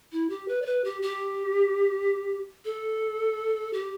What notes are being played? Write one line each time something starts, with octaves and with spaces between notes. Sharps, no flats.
E4
G4
B4
D5
B4
G4
G4
A4
G4